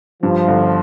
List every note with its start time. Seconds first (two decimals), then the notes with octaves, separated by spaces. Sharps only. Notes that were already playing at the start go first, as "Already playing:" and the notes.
0.23 G2 F3
0.48 G1